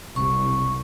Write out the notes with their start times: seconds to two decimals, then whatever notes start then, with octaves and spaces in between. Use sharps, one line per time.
0.16 E1 C2 C#6